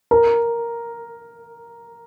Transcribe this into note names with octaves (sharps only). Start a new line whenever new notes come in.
A#4